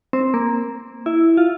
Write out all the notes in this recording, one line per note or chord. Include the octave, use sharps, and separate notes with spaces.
C4
A#3
E4
F4